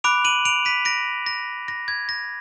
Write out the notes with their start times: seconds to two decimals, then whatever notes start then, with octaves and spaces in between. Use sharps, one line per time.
0.04 B5 D6 F#6 D7 F7
0.25 D#7 F#7
0.45 D7 F7
0.65 B6 D#7
0.85 A#6 D7
1.26 A#6
1.68 A#6
1.88 G#6
2.09 A#6